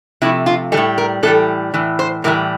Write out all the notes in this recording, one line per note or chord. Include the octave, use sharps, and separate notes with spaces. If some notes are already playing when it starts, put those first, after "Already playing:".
C3 F3 A3 E4
F4
E3 G3 A4
A2
A#4
A2 E3 G3 A4
A2 E3
C5
A2 E3 G3 A#4